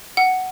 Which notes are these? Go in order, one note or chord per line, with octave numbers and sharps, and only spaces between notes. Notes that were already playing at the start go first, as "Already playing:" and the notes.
F#5